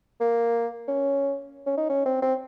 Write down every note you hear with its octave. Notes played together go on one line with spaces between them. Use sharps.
A#3
C#4
C#4
D#4
C#4
C4
C4